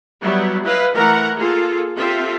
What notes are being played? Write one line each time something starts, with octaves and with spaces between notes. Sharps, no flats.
F#3 G3 B3 E4
E4 B4 D#5 F5
E3 A3 A#4 F#5 A#5
A#3 F4 G#4 A4
C4 F4 G4 A4 E5